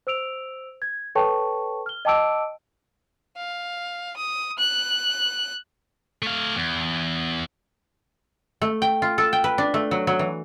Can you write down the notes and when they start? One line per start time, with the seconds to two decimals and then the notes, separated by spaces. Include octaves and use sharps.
0.07 C5 E6 D7 F7
0.82 G#6
1.15 A4 B4 C#5 G5 A5 C#6
1.86 F6 G7
2.05 D#5 G5 A5 D6 E6 D7
3.37 F5
4.16 D#6
4.58 F#6
6.22 A3 F5
6.55 E2
8.62 A3
8.82 G5
9.02 F4
9.18 A4
9.33 G5
9.44 B4
9.58 D4
9.74 A3
9.91 F#3
10.07 F#3
10.19 E3